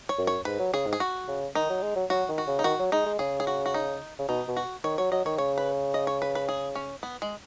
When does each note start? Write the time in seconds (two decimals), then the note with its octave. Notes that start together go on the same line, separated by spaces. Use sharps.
0.09 C#5
0.18 F#2
0.27 C#5
0.45 G#2 B4
0.59 F#3
0.73 C#3 G#4
0.86 G#2
0.93 G#4
1.00 F#4
1.28 C#3
1.55 D#3 D#4
1.70 F#3
1.82 G#3
1.96 F#3
2.10 F#3 F#4
2.29 D#3
2.38 F#4
2.47 C#3
2.59 D#4
2.64 D#3 F#4
2.79 F#3
2.92 G#3 D#4
3.06 G#3
3.19 C#3 G#4
3.40 G#4
3.47 F#4
3.66 F#4
3.74 D#4
4.19 C#3
4.29 B2 D#4
4.48 B2
4.57 F#4
4.84 D#3 C#5
4.98 F#3 C#5
5.12 F#3 D#5
5.25 D#3 C#5
5.38 C#3 C#5
5.58 B4
5.94 D#5
6.07 C#5
6.22 B4
6.35 B4
6.49 G#4
6.75 C#4
7.03 B3
7.22 G#3